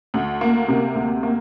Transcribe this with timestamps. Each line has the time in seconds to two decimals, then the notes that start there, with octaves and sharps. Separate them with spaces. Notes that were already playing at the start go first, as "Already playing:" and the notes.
0.14 D2
0.41 A#3
0.68 C3
0.95 D2
1.23 A#3